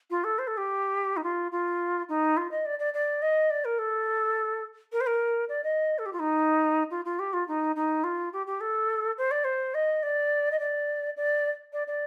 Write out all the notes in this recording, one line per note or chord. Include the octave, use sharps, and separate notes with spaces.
F4
A4
C5
A4
G4
D#4
F4
F4
D#4
F4
D#5
D5
D5
D5
D#5
D5
A#4
A4
A#4
C5
A#4
D5
D#5
A4
G4
F4
D#4
F4
F4
G4
F4
D#4
D#4
F4
G4
G4
A4
C5
D5
C5
D#5
D5
D#5
D5
D5
D5
D5